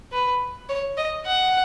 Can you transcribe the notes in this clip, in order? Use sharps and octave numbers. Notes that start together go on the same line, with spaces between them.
B4
C#5
D#5
F#5